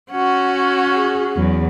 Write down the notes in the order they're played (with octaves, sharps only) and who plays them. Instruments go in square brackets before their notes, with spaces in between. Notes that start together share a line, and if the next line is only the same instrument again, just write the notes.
[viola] C#4 F#4 [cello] F#5
[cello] G#4
E2 F#3